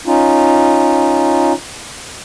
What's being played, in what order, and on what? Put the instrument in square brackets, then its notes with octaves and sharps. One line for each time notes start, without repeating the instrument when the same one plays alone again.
[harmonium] C#4 D#4 F4